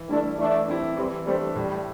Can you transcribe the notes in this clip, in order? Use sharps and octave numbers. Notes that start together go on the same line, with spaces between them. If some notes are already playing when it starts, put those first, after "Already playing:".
Already playing: E3
G3 A3 D4 E4 A4
E3 A3 D4
A3 C4 E4 G4
E3 G3 C4
G3 A3 C4 D4
A2 G3